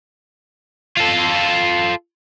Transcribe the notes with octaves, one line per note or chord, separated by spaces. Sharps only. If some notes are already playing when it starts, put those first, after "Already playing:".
F4 A4